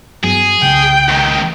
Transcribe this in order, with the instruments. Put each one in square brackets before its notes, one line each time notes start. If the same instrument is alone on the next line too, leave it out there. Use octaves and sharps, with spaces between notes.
[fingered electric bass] G2 F#3 B3 [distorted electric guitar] G#4
[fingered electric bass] C2 C#3 [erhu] G5
[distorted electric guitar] C#2 D#3